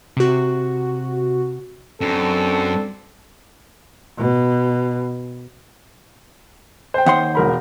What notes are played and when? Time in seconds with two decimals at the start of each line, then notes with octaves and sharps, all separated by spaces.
0.17 C3 F#4
2.01 F#2 C4 D4 A4
4.18 B2
6.94 C5 G5
7.06 D#2 F#5 C6
7.35 E1 A#4 B5